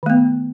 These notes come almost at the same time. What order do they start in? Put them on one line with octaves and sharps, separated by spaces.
D#3 A3 B3